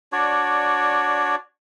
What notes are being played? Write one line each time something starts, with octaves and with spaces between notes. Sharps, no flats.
D4 F#4 C#5 D5